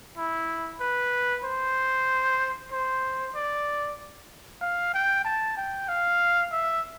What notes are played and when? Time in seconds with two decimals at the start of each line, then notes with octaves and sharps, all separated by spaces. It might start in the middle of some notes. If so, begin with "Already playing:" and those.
0.17 E4
0.81 B4
1.45 C5
2.72 C5
3.35 D5
4.61 F5
4.94 G5
5.25 A5
5.57 G5
5.89 F5
6.52 E5